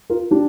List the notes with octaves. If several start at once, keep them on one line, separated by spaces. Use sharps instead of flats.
F4 A#4
D4 G4